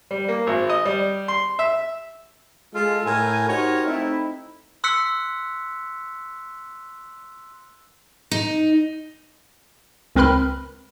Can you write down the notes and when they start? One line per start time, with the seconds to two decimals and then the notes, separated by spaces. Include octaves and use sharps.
0.11 G3
0.28 A#3
0.47 G#1
0.69 D#5
0.85 G3
1.28 C6
1.59 E5
2.73 G#3 F4 A4
3.05 A2 A#4 G#5
3.47 D#4 F#4 G4 A#4 C5 C#5
3.87 A3 C4 D#4 E4
4.84 C6 E6 F#6 B6 C#7
8.31 D#4
10.16 C#2 C4 A#4 B4 B5 F6